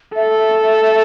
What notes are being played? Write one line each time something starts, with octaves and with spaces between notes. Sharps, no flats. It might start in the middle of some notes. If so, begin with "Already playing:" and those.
A4 E5